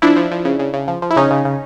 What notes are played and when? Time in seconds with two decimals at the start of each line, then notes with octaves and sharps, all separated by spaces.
0.02 F3 D4 E4
0.16 F3
0.31 F3
0.45 C#3
0.59 C#3
0.74 C#3
0.88 F3
1.02 F3
1.11 E4
1.16 C#3 C#4 D#4
1.31 C#3
1.45 C#3